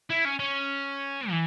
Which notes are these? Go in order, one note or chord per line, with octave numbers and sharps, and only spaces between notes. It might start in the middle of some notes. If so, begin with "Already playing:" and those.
E4
C#4
C#4
E3